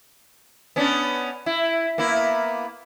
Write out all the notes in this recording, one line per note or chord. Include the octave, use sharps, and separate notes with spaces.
B3 C#4 D4
E4
A#3 B3 E4